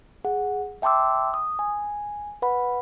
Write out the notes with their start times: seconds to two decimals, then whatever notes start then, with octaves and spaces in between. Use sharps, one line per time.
0.25 G#4 F#5
0.82 E5 G5 A5 C6 D6 E6
1.34 D#6
1.59 G#5
2.42 B4 F#5 B5